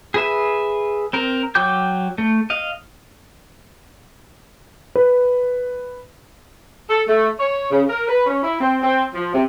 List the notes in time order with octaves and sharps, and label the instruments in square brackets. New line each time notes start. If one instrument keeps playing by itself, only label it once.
[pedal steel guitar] G#4 B4 E5
C4 A#4
F#3 G5 D6 G6
A3
D#5 F5
[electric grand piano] B4
[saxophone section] A4
A3
C#5
C#3
A#4
B4
C#4
E4
C4
C4
F3
C3